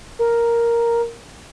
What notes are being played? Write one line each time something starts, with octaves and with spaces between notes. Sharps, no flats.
A#4